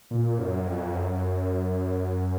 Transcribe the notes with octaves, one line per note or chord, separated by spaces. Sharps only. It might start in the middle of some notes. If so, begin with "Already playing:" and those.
A#2
F#2
F2
F#2